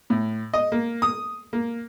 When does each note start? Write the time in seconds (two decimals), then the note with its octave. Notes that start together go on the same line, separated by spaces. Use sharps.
0.10 A2
0.54 D#5
0.72 A#3
1.02 D#6
1.53 A#3